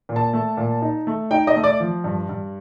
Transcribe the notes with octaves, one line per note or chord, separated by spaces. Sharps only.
A#2
A5
A3
A#2
D#4
A3
D#4 G5
D#5
A3
D5
F3
G2
G2